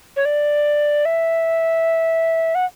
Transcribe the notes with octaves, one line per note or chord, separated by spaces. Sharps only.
C#5
D5
E5
F#5